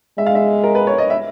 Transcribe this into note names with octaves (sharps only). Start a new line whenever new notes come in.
G#3 E5
F5
E5
A#4
B4
C#5
D#5
E5